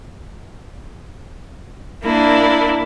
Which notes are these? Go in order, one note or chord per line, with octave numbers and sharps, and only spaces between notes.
A#3 D4 E4